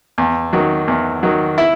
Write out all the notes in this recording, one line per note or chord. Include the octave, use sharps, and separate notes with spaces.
E2
D#3 F#3
E2
D#3 F#3
E4